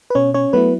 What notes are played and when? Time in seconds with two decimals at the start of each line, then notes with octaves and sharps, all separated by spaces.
0.10 B4
0.15 B2 C#4 C#5
0.34 C#4 C#5
0.53 F#3 A3 B3 E4 B4